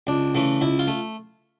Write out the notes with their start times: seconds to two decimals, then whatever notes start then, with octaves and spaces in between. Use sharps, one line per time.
0.07 C#2 D4
0.35 C#3 E3 A3
0.61 C#2 E4
0.79 F4
0.88 A3